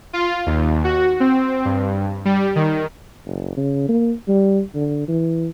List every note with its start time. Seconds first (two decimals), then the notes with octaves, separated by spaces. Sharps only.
0.13 F4
0.46 D#2
0.84 F#4
1.20 C4
1.65 G2
2.25 G3
2.56 D#3
3.26 F#1
3.57 C#3
3.89 A#3
4.28 G3
4.75 D3
5.08 E3